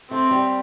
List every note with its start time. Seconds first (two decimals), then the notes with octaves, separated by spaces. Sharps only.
0.11 A3 C4
0.31 G3